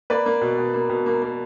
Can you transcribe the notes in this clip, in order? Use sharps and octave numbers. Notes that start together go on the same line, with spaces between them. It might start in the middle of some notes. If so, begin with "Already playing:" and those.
A#3 B4 D5
A#3
B2
B2
A#3
B2
A#3
A#3